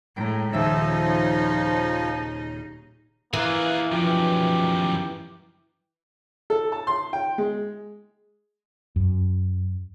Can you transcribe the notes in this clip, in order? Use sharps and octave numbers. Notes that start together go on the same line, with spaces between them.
A2 G#3 G5 A#5
D#1 C#3 F3 D#4 E5
E3 A#3 F4 G#4
F#2 D#3 F3 G4
A4
A5
C6
G5
G#3
F#2